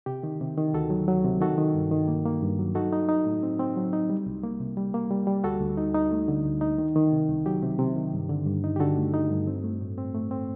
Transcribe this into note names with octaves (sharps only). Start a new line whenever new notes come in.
C3 G4
D#3
C3
D#3
D2 F#4 A4
F#3
F#3
C3
D#3 F#4 A4
D#3
G2
D#3
A#3
A#3
G2
F#3
D#4 F#4 A4
D#4
D#4
A2
C4
C4
F#3
D#4
G3
C2
A#3
C3
G3
A#3
G3
G3
D2 F#4 A4
D2
D#4
D#4
A3
D3
D2
D#4
D#3
D#3
C3
C2
F#3 G4
C3
C3
D#3
G2
D3
G2
D#4
G4
D3 F#4 A4
A3
D#4
G2
C4
A3
A2
C4
A3
C4